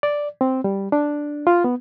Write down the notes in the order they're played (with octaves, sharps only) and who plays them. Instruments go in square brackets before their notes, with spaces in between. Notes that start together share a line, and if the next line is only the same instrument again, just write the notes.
[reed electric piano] D5
C4
G3
D4
F4
B3